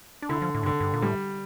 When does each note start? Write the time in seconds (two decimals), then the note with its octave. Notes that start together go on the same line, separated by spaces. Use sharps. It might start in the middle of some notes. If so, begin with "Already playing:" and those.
0.22 D4
0.29 D3 E4
0.42 F3
0.55 A2
0.63 G2 D3
0.80 G2
0.94 A#2
1.02 A2 G3